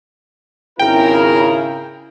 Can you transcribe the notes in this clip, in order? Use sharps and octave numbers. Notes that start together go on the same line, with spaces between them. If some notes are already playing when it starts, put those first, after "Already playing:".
G#1 C#3 E4 A#4 G5